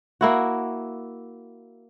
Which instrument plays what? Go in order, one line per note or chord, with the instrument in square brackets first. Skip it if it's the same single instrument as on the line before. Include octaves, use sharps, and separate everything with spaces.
[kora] A#3 E4 F#4